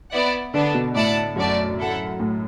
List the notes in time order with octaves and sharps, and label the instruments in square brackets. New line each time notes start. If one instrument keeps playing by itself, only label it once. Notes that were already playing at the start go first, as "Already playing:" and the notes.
[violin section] B3 E4 D5 F#5
[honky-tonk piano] D3 [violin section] B3 D4 A4
[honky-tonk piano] B2
[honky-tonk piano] A2 [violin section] E4 D5 F#5 A5
[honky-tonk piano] F#2 [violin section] A3 F#4 D5 A5
[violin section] E4 A4 F#5
[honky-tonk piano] A2